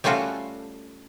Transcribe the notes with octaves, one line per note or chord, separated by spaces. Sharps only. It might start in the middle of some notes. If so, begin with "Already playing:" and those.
G3 A3 C#4 F4 F#4 A4